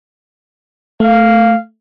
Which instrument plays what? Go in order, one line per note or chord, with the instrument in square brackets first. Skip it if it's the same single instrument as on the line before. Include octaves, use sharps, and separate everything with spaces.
[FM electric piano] A3 [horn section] F5